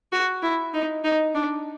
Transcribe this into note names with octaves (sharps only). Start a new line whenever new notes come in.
F#4
E4
D#4
D#4
D4